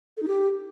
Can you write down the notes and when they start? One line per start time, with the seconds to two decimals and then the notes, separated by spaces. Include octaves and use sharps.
0.17 A4
0.22 D#4
0.28 G4